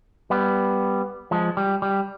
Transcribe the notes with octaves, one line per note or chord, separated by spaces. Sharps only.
G3 B3
F3 G#3
G3
G3